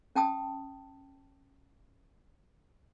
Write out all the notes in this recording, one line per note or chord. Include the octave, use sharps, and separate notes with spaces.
C#4 G5 A5 D#6